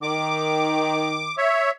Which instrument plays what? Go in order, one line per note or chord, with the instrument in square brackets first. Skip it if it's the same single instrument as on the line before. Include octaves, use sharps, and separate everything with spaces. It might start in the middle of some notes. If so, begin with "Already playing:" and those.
[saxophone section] D#3 [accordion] D6
[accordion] C#5 E5